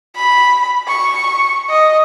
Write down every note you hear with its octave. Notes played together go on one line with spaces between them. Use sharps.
B5
C#6
D#5